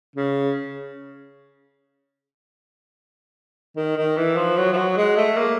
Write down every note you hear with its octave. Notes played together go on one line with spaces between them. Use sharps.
C#3
D#3
D#3
E3
F3
F#3
F3
F#3
G#3
A3
A#3